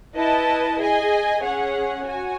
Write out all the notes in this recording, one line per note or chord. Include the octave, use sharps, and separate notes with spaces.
E4 B4 D#5 A5
G#4 D#5 G#5
C#4 G#4 C#5 F#5
F#4 C#5 G#5